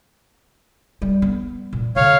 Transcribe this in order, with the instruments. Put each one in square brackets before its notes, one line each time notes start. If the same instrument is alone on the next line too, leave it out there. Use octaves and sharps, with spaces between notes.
[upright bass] G3
B3
A#2
[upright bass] B2 D3 [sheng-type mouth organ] C#5 F5